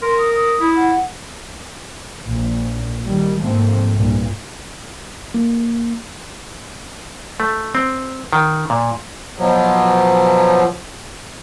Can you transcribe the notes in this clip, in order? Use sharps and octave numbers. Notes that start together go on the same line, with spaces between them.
A#4 C6
D#6
D#6
E4
F#5
A#1
D#3 G3
G#2 C3 F3 A3 A#3 C4
C2 G2 A#2
A#3
A3
C4
D#3
A#2
B2 F3 F#3